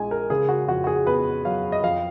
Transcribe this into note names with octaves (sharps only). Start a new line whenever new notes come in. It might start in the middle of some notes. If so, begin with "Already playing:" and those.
Already playing: A#1 G#3 G#5
A#4
C#3 G#4
F#4
F2 F#4
F#4
G#4
B3 B4
F#3 F5
D#5
F2 F5